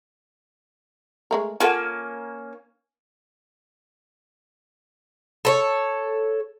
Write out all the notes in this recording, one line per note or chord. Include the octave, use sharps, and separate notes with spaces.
G#3 A3 A#4
A#3 C#4 F4 A4 F#5
A4 C5 C#5